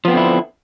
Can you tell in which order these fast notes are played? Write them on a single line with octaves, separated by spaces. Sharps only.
F3 B3 C4 D3 E4